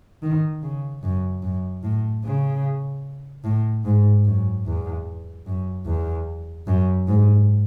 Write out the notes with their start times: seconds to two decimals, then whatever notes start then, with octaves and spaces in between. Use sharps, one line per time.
0.23 D#3
0.62 C#3
1.03 F#2
1.43 F#2
1.83 A2
2.24 C#3
3.44 A2
3.85 G#2
4.25 F#2
4.66 E2
5.46 F#2
5.86 E2
6.67 F#2
7.08 G#2